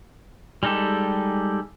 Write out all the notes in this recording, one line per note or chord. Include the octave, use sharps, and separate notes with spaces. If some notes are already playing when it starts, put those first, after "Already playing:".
G3 G#3 D#4 G4 A4